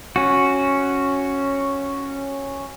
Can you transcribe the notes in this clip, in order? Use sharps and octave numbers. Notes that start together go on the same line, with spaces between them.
C#4 F#4